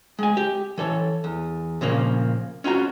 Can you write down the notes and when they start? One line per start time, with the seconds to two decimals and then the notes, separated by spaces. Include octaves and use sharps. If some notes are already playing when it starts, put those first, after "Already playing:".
0.19 G#3 G#5
0.37 G4
0.78 E3 A4 C#5
1.24 E2
1.81 A#2 C#3 F3 A#3
2.64 C#4 F4 F#4 A#5